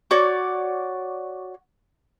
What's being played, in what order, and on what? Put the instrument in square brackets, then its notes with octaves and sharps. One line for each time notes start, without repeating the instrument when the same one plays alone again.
[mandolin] F#4 C#5 D5